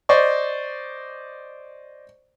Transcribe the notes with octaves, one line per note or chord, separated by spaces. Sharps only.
C5 D5 D#5 C#6